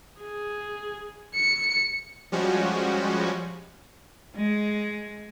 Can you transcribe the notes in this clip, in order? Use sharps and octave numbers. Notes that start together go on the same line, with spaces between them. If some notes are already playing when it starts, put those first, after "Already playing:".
G#4
C#7
F3 G3 G#3 C#4 F#4
G#3